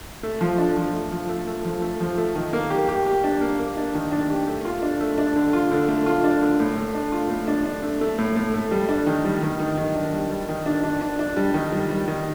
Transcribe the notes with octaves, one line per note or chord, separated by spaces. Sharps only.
A3
F3
D4
F3
A3
F3
A3
A3
F3
A3
F3
A3
D#3
A#3
G4
G4
G4
D4
A#3
A#3
D4
D#3
D4
G4
A3
F4
D4
A3
D4
D3
F4
D3
A3
F4
D4
D3
A2
A3
D4
F4
A2
D4
D4
A3
A3
A2
A2
A3
G3
D4
D#3
G3
D#3
D#3
D#3
D4
G3
G3
D#3
D4
D4
D4
D4
G3
D#3
G3
G3
D#3